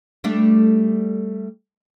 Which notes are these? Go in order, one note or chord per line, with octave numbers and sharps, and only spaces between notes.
G3 A3 D4